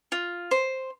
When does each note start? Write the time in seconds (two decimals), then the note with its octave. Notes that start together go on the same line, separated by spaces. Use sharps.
0.12 F4
0.51 C5